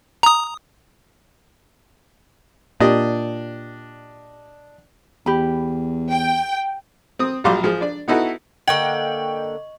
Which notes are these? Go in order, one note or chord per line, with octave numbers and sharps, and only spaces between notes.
A#5 D#6
A#2 D4 G4 D#5
E2 G4 B5
G5
C4 D#6
A#1 F#3 G3 F5 C6 D6
F3 G#4
D4 D5
B3 D#4 E4 F#4 A4 B4
D3 A#3 D#5 F#5 G5 C#6